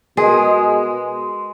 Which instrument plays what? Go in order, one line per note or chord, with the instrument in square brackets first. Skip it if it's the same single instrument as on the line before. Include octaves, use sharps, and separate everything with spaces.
[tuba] B2 [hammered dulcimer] G#3 [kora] G#4 [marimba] A#4 D#5 G#5